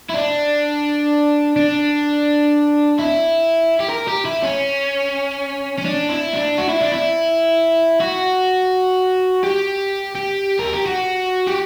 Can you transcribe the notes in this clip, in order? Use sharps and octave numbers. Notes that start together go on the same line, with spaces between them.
E4
D4
D4
E4
G4
A#4
G4
E4
C#4
C#4
D4
E4
D4
F#4
E4
D4
E4
F#4
G4
G4
A#4
G4
F#4
G4